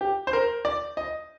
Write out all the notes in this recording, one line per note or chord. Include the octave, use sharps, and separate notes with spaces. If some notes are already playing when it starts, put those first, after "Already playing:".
G4
C5
A#4
D5
D#5